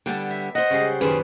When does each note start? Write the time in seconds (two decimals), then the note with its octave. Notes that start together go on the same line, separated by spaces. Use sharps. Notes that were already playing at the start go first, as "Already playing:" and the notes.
0.06 D3 G3 B3 G5 A5
0.30 E5
0.55 C5 D#5 F#5
0.70 C#3 G3 G#3
1.01 F#2 A#2 D#3 G#4 B4 C5